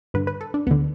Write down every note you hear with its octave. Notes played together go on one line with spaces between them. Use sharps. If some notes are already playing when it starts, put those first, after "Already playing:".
G2 D3 B4
B4
A4
D4
D2 D3 B3